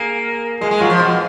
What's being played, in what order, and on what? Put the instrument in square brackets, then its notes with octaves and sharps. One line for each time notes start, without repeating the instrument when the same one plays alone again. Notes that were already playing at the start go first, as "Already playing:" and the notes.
Already playing: [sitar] A#3 [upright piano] G#4
[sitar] G#3 [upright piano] G#4
[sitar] G#3
[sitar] F#3 [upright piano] F4
[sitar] F3
B2